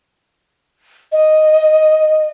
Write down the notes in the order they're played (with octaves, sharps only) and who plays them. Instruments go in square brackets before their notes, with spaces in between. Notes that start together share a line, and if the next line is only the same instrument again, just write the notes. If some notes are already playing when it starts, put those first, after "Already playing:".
[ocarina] D#5